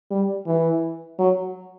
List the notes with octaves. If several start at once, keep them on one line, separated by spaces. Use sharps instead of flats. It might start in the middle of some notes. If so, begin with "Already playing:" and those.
G3
E3
F#3